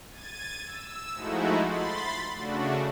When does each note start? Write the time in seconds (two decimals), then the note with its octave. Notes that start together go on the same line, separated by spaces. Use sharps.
0.10 G#6 A6 D#7
0.65 E6
1.14 F3 G#3 A3 D#4 E4 F#4
1.61 B5 C6 A6
2.35 C#3 A3 D4 F#4